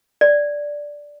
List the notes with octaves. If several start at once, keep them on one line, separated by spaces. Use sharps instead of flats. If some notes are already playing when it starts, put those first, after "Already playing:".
D5